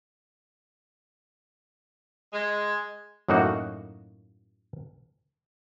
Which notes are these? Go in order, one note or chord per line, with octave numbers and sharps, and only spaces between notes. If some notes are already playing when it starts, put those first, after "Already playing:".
G#3
F#2 A2 A#3 D#4 F#4